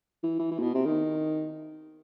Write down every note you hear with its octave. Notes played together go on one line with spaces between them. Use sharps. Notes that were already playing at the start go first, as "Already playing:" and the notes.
E3
E3
E3
A#2
B2
C3
D#3